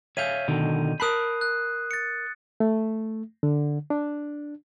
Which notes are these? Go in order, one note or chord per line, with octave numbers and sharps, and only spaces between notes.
C#5 E5 F5 G6 D#7
B2 D3 D#3
A#4 A5 B5 D#6 F#6 C7
F#6
A6 C#7
A3
D3
D4